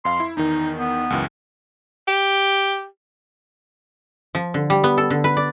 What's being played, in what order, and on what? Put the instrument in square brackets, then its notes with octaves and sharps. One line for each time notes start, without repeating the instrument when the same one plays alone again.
[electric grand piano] F2 F5 [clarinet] C6
[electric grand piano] E4
[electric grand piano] E2 D#3 [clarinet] D#4
[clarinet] B3
[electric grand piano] C#2 F#2 E3
[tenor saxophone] G4
[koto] F3
D3
G3
B3
A4
D3
B4
D5